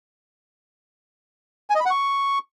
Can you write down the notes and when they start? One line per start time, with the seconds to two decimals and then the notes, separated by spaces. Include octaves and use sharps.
1.70 G#5
1.75 D#5
1.80 B5
1.85 F#5
1.90 C#6